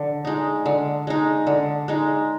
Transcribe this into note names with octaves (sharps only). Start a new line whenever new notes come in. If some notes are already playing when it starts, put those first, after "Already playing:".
Already playing: D3
G#3 D#4
D3
G#3 D#4
D3
G#3 D#4